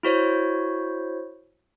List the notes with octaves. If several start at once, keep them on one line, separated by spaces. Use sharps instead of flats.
E4 F#4 C5 C#5